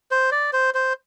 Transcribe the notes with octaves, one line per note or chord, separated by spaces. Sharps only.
C5
D5
C5
C5